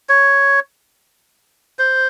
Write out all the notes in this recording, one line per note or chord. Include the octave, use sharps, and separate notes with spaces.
C#5
C5